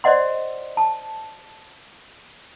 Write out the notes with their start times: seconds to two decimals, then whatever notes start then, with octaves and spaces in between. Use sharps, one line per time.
0.04 C5 D5 D#5 F#5 C6
0.77 A5